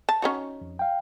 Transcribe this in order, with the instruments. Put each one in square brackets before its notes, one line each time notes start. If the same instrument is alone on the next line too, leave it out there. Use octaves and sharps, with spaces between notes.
[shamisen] A5
C#4 D#4 F#4
[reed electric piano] F2
F5 G5